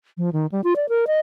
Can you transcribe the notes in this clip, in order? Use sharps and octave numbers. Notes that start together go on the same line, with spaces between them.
F3
D#3
G3
F4
D5
A#4
D#5